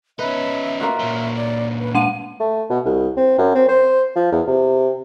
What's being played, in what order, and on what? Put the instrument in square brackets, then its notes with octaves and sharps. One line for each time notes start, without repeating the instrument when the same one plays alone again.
[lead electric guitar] C#4 D#4 [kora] B4 [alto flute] E5
[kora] A#3 F4 F#4
[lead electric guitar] A#2 F#3
[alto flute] D5
B4
[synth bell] G#3 F#5 D#7 [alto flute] A5
[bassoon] A3
B2
C2
C4
F#2
C4
C5
F3
E2
C3